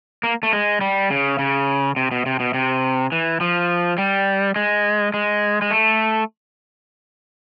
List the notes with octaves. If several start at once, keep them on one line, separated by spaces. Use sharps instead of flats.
A#3
A3
G#3
G3
C#3
C#3
C3
B2
C3
B2
C3
E3
F3
G3
G#3
G#3
G#3
A3